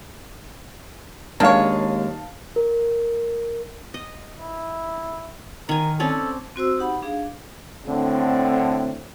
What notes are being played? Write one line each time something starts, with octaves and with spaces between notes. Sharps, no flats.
D#2 G#3 A#3 C#4 D4 C#5 F5 A5
A#4
D#5
E4
D#3 A#4 G#5
C4 C#4 A4 D5
C4 F#4 C5 E6
D#4 G4 F#5 B5
D4 G#4 F5
A2 D3 C4